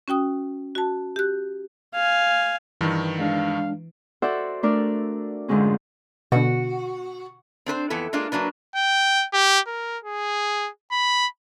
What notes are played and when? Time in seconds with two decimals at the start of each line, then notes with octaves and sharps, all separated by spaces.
0.08 C#4 F#4 G5 D#6
0.75 F#4 A5
1.16 G4 F#6
1.94 F5 G#5
2.81 G2 D#3 E3
3.19 G#3 D4 F5
4.22 F#4 A4 C5 D5 E5 F#5
4.63 A3 D4 A#4 D5
5.48 F2 G#2 D3 F3 G#3 C#4
6.32 B2 D3 F#4
7.66 C4 D4 B4 C5
7.90 F2 E3 B3 A4
8.13 G#3 A#3 D4 F4
8.32 F#3 A#3 D4 B4
8.75 G5
9.33 G4
9.67 A#4
10.04 G#4
10.92 B5